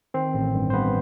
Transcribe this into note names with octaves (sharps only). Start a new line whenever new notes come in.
D#3 C4 C5
A1
G2
C5
G2 B3 B4